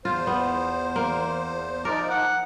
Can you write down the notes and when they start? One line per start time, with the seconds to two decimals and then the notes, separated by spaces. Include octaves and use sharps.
0.05 E2 F4 C5
0.27 B3
0.96 A#3
1.85 F3 D#4 A#4 D5
2.10 F#5